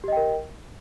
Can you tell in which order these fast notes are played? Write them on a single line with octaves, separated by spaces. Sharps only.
G4 D#5 G5 A#4